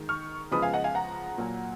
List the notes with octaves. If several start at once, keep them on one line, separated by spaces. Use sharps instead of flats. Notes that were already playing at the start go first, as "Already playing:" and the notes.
Already playing: D#3 G#3
C#6 F6
C#3 F3 G#3 B3 B5 D#6
F5 G#5
D#5 F#5
F5 G#5
F#5 A#5
A#2 F#3 A#3